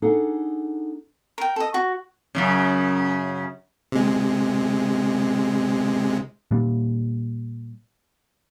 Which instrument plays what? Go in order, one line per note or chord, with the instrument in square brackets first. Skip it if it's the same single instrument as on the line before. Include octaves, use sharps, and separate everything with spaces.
[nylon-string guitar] D4 D#4 G#4 A4 F#5
[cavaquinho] A#4 G5
A4 D#5
F#4
[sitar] F#2 A2 C#3
[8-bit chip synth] C3 G#3
[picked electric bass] A#2 G3